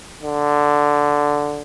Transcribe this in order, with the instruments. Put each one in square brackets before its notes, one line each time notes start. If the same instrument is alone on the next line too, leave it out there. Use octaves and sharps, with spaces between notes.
[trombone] D3